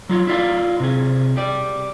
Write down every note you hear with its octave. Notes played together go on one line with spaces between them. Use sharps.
F#3 F4 C#5
E4 F4 D5 F5
C3 G#4
G4 D5